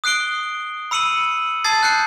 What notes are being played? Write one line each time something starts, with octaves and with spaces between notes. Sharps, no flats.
D#6 F#6 C7 D7 G7
B5 E6 C#7 D#7 F#7
A5 D#6 G#6 A6 C7
F#6 G6 C7 C#7